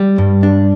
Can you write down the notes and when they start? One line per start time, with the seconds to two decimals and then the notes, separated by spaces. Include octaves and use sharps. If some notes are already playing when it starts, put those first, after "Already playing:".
Already playing: G3
0.18 G2
0.43 D4